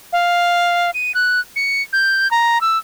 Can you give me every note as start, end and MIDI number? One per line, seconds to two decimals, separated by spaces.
0.13 0.90 77
0.94 1.14 99
1.15 1.40 90
1.56 1.82 97
1.93 2.30 91
2.31 2.60 82
2.61 2.78 88